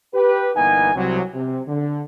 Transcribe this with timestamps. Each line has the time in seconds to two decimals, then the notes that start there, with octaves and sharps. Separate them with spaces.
0.14 G4 B4
0.56 G1 E3 A#3 B3 D#4 G#5
0.95 C2 C3 F#3
1.34 C3
1.68 D3